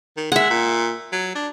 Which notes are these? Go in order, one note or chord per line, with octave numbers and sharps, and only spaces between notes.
D#3
G#3 E5 F#5
A#2
F#3
D4